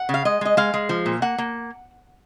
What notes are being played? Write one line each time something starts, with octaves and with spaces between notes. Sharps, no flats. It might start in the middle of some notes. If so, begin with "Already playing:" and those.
Already playing: F#5
C#3
F5
G#3 D#5
G#3 D#5
G#3 F5
G#3
F3
A#2
A#3 F#5
A#3